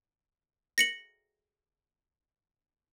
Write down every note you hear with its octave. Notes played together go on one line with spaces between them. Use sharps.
A#6 C#7 F#7